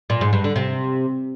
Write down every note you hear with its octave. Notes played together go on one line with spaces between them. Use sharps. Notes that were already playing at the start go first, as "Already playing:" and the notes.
A#2
G#2
G2
D3
C3